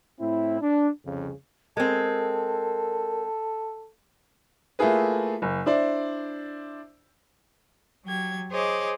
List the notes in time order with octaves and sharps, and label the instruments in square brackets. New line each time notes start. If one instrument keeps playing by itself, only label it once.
[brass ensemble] A2 C4 E4
D4
C2 F2 C#3
[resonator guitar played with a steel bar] G#3 C4 [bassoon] A4 [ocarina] A#4
[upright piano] A3 A#3 E4 F4 G#4 B4
F#1
D4 E4 C5 D5
[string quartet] F#3 G4 G#6
G#4 C5 C#5 D#5 D6